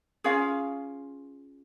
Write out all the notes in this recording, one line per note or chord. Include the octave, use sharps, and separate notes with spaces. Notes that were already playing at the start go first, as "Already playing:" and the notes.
C#4 F4 G#4 F5